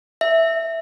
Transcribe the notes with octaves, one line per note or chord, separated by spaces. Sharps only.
E5